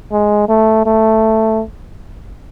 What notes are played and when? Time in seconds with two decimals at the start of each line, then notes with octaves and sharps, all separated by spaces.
0.12 G#3
0.48 A3
0.86 A3